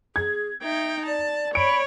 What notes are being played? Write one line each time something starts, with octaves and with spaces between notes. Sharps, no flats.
G#4 G#6
D#4 E5 G5
D5 A5
C#5 B5 D7